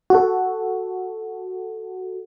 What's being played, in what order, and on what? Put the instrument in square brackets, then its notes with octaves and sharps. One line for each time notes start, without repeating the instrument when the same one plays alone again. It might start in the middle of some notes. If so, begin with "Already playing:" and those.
[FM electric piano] F#4 A4